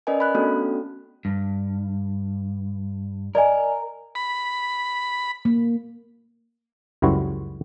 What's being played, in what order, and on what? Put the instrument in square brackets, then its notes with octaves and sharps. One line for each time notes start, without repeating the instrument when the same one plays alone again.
[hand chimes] C#4 A#4 B4 D5 D#5 G#5
B5 F#6
A3 B3 C#4 D4 F#4 A4
[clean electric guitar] G2
[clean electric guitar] A#4 [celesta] D5 D#5 G#5
[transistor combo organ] B5
[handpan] A#3
[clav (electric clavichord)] C#2 F#2 G3 E4 F#4 C5